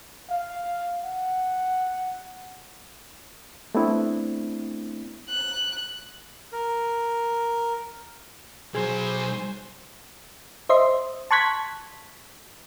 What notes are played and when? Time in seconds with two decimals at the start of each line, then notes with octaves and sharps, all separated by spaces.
0.30 F5
1.04 F#5
3.75 A3 B3 C4 D4 E4
5.29 F#6
6.52 A#4
8.75 B2 F#3 G#4 C5 G#5
10.69 C5 D#5 E5 C6
11.31 A5 C6 C#6 F#6 G#6 B6